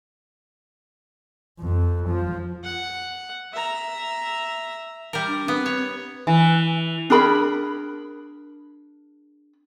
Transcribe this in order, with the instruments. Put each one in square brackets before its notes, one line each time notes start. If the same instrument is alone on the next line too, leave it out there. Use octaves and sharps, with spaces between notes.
[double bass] F2
F3
[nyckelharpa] F#5
E5 A#5
[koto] G3 A#4
[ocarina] D4
[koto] B3 [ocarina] C4
[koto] C#5
[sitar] E3
[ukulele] D4 G#4 A#4 B5